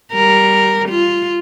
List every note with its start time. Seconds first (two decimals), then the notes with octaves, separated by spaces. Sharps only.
0.13 G3 A#4
0.89 F4